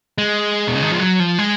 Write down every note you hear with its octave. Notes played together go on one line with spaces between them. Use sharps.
G#3
B2
C#3
D#3
F3
F#3
F3
G#3